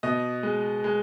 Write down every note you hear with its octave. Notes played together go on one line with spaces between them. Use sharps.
B2 D#5
G#3
G#3